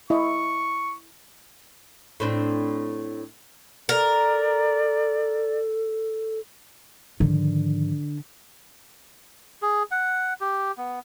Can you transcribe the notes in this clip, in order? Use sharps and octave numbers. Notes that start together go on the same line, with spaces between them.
E4 D#5 C#6
A2 C4 D4
A4 A#4 D5
G#2 D3 D#3 F3
G#4
F#5
G4
B3